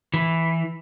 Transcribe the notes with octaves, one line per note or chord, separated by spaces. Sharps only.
E3